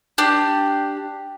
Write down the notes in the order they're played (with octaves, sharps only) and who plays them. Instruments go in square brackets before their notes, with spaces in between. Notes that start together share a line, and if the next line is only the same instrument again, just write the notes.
[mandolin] D4 G4